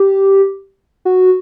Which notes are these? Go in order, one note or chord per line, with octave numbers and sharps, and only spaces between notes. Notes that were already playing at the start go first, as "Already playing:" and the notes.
Already playing: G4
F#4